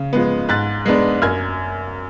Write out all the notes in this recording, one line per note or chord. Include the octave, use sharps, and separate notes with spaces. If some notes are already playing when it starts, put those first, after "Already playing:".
Already playing: C#3
F3 G#3 B3
G#2 F#6 A6
G#3 B3 D4
F#2 F6 G#6